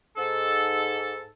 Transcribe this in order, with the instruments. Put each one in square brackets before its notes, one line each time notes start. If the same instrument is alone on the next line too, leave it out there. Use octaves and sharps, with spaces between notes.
[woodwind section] G#2 A4